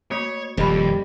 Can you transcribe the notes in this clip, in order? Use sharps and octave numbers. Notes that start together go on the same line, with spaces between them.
A3 A#3 F#4 C#5
D#1 F2 G3 A4 D#5 B5